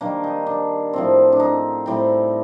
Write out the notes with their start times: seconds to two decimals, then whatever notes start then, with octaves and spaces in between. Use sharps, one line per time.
0.01 D#3 G3 A#3 D4
0.24 D#4
0.47 D4
0.93 A2 F3 C4
1.33 D4
1.40 D#4
1.86 A2 G3 C4